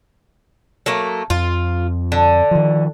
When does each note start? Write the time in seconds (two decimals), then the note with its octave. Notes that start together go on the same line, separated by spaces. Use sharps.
0.86 F#3 A3 A#3
1.30 F2 F4
2.12 D3
2.51 D#3 F3